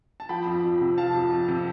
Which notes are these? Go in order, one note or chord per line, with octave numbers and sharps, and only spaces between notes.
A5
F3 G5 B5
F2
F2
C3
F3 F5 A5
F2
F2
C3